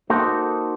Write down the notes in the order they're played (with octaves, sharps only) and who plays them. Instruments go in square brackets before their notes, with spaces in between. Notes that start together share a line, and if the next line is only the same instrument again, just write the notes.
[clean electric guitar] A#3 D#4 F#4 A4 C5